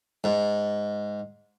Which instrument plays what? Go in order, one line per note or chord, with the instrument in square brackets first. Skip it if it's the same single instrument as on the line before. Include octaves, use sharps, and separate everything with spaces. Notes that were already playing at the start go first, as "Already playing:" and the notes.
[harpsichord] G#2